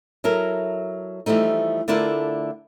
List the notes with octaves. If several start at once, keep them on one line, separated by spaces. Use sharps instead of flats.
F#3 E4 A4 A#4
E3 F3 G3 A3 D#4
D3 A3 D4 E4 F4 A#4